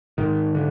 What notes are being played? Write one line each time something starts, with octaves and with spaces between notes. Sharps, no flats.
G#2 D#3
D3